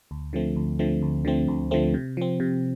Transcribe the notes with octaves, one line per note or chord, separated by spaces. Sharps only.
D2
D3 F3 A3 C4
D2
D3 F3 A3 C4
D2
D3 F3 A3 C4
D2
D3 F3 A3 C4
C3
F3 C4
C3